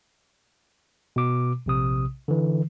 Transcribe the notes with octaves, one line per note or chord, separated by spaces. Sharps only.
B2 D6
A#1 C3 D#6
D3 E3